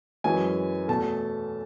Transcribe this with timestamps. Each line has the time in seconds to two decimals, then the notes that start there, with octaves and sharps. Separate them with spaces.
0.24 F#2 E3 G#3 G#5
0.88 E2 B2 A3 A5